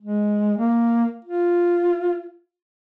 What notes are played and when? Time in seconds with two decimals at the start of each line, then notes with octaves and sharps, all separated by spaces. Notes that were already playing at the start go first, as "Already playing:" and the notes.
0.01 G#3
0.58 A#3
1.25 F4